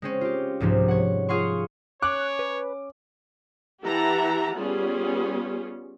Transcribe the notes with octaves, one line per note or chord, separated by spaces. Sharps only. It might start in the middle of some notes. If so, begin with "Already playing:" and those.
G#3 C4 C#4
F4 G4
C2 G#2 C3 F3
C#5 F#5
F4 G#4 F5 F#5 C6 C#6
C#4 C#5 D6 F#6
B4
E3 G4 E5 F#5 A5 A#5
G3 B3 C#4 F4 G4 G#4